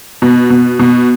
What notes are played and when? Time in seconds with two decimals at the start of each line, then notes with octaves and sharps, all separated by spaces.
0.22 B2
0.50 B2
0.79 B2